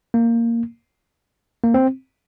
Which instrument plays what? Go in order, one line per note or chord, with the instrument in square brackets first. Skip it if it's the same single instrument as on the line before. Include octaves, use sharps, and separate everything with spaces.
[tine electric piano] A#3
A#3
C4